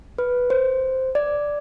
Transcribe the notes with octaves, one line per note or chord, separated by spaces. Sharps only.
B4
C5
D5